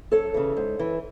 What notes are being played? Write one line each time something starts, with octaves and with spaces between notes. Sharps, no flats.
F#2 A4 C#5
C#3 E3
G#2
E3